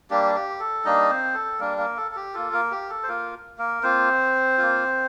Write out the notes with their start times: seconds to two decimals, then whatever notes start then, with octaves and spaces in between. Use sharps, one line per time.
0.10 G3 A#3 D4 G4
0.35 G4
0.60 A4
0.85 G3 A#3 D4 D#4 D#5
1.09 C4 C5
1.34 A4
1.60 G3 A#3 D4 A#4
1.78 A#3 A#4
1.97 A4
2.11 A4
2.16 G4
2.34 A#3 F4 A4
2.53 A#3 A#4
2.71 G4
2.90 A4
3.03 C5
3.08 A#3 F4 A#4
3.58 A#3 A#4
3.83 A#3 C4 F4 C5
4.58 A#3 F4